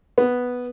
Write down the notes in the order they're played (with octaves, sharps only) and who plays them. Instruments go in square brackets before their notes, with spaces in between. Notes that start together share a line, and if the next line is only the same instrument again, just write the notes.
[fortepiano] B3